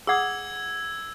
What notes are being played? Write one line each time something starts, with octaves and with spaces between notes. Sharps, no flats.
G#4 F#5 D#6 E6 G#6